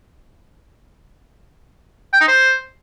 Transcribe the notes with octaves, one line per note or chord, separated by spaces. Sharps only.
G5
D#4
C5